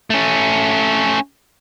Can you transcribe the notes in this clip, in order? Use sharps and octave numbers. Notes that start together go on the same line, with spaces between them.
A3 C#4